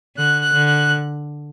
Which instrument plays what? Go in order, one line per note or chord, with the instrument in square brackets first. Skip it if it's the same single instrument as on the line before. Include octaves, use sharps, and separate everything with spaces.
[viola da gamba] D3 [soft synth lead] F#6
[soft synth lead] F#6
[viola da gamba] D3
[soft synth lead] F#6